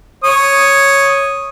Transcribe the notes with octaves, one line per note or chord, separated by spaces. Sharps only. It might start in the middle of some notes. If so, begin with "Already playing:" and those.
C#5 D#6